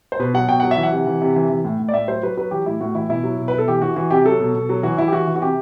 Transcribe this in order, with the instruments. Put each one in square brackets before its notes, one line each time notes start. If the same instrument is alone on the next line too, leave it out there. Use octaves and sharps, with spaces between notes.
[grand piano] C5
B2 B4
F#3 F#5
B2 G5
F#3 F#5
E5
E3
F#5
C3
E3
C3
E3
E3
A2
A2
D5
A2 E5
F#3 C5
F#3 B4
F#3 B4
E3 G4
A2 E4
A2 F#4
E3 E4
B2 E4
F#3
B2
B4
B2
A4
E3 G4
E3 F#4
E3 F#4
C3 G4
F#3 A4
B2
B2
F#3
E3 F#4
E3 E4
G4
E3 F#4
E3
F#4
C3 G4